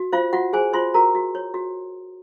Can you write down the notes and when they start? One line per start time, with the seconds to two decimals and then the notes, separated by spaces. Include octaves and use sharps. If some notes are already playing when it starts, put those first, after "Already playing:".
Already playing: F#4
0.13 F4 C5 F5
0.33 F4 F#4 F#5
0.53 G#4 C5 G#5
0.73 F4 C5 C6
0.94 F#4 A#4 A#5
1.15 F#4
1.35 C#5
1.54 F#4